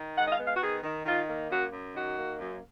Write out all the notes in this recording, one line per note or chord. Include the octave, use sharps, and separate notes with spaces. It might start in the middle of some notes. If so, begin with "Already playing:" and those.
Already playing: D#3
G#3 F#5
D#5
F5
B3
F5
F#4
D#3 G#4
D#3
D#3 F4
A#3
F#2 F#4
F#2
D#3 F#4
A#3
F#2